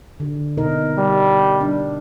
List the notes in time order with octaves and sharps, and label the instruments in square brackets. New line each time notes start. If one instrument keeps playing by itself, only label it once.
[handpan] D3
B2 D#4 A#4
[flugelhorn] G3
[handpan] D4